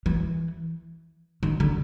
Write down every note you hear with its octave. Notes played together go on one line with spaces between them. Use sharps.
E3
D#3
D3